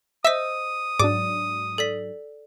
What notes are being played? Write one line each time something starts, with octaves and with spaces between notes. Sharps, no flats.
C5 D#5 E5 D#6 E6 B6
G#2 F#3 D4 D5 D6
A4 D5 B6